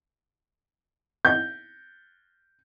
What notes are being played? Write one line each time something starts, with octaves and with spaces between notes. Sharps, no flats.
G6